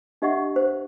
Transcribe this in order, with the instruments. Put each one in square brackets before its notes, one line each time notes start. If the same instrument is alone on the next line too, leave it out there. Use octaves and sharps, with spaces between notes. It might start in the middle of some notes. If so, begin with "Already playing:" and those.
[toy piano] D4 G4 D#5 E5 F#5 C#6
C5